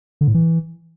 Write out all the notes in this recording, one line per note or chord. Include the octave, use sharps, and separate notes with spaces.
D3
A2
E3